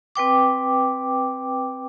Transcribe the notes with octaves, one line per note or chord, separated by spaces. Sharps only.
C4 B4 G5 D6